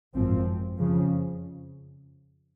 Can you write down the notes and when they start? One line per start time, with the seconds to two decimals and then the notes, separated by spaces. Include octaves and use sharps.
0.15 G#1 F#2 F3 C4
0.78 F2 C#3 F3